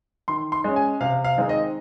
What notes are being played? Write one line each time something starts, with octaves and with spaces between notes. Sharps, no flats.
D#3 C6
C6
G#3 C#4
G#5
C3 F5
F5
D#3 G#3 C4 D#4
D#5